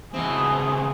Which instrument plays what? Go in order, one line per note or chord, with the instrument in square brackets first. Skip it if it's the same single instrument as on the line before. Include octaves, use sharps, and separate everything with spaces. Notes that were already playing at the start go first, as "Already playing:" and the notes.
[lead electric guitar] C#2 C4 [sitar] B2 E3 [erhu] G#4